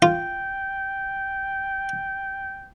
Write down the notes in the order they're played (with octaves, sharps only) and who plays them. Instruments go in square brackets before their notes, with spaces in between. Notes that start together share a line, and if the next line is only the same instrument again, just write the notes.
[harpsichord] F4 [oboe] G5